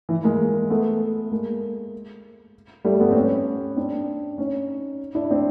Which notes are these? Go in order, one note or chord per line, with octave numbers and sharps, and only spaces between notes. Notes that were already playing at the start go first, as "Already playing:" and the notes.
E3
G#3 A#3
A3 B3
G#3 A#3
G3 A3
A3 B3
C4
B3 C#4
C4 D4
C#4 D#4
D4 E4
C4 D4